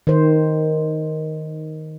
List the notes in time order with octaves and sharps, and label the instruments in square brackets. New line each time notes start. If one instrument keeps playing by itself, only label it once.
[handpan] D#3 C5